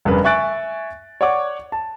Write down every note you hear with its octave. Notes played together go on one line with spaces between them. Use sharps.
F1 G2 C#3 A#4 B4
E5 G#5 C#6 F#6 A6 D7
C#5 D5 F#5 C#6 D6
A5